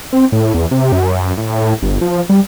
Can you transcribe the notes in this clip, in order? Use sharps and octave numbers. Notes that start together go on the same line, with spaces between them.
C4
A2
E2
C3
F#2
A2
G1
F3
G3